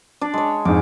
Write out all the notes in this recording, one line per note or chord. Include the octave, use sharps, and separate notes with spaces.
D4 D5
G#3 C#5
F2 G#2 D6